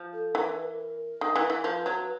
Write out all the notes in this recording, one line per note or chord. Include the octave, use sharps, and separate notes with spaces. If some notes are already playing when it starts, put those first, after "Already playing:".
Already playing: F3
A4
E3 A#4
B4
A#4
A#4
D#3
E3
E3
F3 B4
F#3 B4